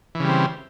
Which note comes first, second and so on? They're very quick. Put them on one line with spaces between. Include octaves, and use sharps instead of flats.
E3 C#3 G3 C4